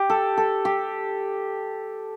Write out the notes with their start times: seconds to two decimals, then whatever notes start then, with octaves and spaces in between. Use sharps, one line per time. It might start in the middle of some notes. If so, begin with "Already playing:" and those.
Already playing: G4
0.10 A4
0.37 A4
0.65 G4